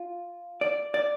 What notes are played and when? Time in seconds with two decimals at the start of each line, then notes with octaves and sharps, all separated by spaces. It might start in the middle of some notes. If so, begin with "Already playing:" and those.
Already playing: F4
0.61 D5
0.94 D5